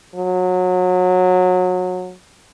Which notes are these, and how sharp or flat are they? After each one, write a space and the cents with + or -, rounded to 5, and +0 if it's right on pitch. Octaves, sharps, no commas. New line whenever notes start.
F#3 -25